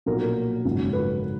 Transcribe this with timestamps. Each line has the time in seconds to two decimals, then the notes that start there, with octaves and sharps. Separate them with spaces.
0.06 B1 A#2 F#3 A#4
0.65 G#1 F#2 C#3 F#3
0.93 B4